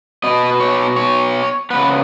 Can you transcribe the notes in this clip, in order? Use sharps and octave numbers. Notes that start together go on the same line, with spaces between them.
B2 B3 D#5
C#5
C#5
C#3 B3 B4